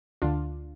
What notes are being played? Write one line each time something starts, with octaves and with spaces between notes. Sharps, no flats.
D2 D3 D4 F4